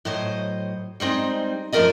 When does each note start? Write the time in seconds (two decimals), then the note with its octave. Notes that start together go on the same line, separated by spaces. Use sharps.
0.05 A2 F#3 C5 D#5
1.00 G3 G#3 C4 D#4
1.72 F#2 F3 A3 A#4 D5 D#5